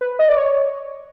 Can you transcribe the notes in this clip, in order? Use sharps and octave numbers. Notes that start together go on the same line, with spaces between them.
B4
D#5
D5
C#5